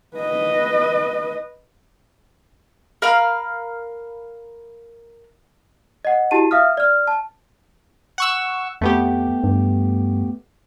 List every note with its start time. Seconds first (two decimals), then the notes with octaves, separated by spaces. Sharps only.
0.17 B4 D#5
3.02 A#4 F5 B5 F6
6.05 D#5 F#5
6.31 E4 F#4 G4 A5 D#7
6.51 E5 F5 D#6 F6
6.77 D5 F6
7.07 A5
8.18 F#5 C#6 E6
8.81 F2 A3 B3 G4
9.44 G2